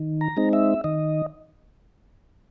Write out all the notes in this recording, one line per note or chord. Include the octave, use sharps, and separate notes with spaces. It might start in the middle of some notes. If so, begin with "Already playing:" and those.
Already playing: D#3
A#5
G#3 C4 D#4
E5
D#3 D#5